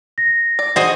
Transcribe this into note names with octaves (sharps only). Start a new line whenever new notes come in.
A#6
D5
F#4 G#4 C5 D#5